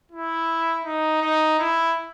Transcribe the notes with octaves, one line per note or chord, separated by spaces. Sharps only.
E4
D#4
D#4
E4